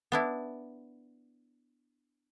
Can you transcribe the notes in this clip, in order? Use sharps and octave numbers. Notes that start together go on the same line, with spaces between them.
B3 D4 E4